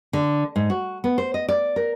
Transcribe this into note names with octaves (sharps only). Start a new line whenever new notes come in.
D3
G#2
F#4
B3
C5
D#5
D5
A#4